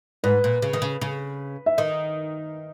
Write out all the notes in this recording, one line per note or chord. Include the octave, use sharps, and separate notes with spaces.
G#2 B4
A#2
C#3
D#3
C#3
C#3
E5
D#3 D#5